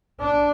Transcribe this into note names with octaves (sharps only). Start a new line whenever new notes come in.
D4